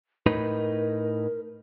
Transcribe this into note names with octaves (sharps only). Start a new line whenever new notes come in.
A2 D#4 A#4 B4